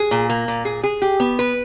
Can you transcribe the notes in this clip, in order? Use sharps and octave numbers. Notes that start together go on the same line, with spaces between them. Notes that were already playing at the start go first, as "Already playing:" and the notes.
Already playing: G#4
A#2
A#3
A#2
G#4
G#4
G4
B3
B4